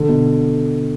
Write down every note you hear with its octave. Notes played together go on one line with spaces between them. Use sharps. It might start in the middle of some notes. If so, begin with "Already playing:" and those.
Already playing: D3
B2